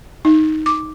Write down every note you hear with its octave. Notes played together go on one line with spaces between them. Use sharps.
D#4
D6